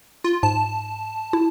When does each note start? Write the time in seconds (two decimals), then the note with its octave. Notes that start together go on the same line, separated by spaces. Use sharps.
0.24 F4
0.43 G#2 A5
1.33 E4